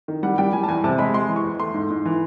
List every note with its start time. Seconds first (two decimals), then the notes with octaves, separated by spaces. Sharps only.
0.08 D#3
0.23 G3 F#5
0.38 G3 G5
0.53 G3 G#5
0.63 A5
0.68 E2 G#5
0.84 C3 A5
0.98 G#3 B5
1.14 G#3 C6
1.29 E3
1.36 C#6
1.44 E2
1.60 A3 C6
1.74 G#2
1.90 G#2
2.05 E3